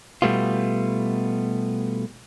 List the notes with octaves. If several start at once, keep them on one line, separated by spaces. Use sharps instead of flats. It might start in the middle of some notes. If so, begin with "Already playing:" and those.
B2 G3 A3 B3 F4